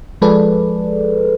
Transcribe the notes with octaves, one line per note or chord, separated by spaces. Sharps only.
F3 G#3 G#4 A4 B4 D5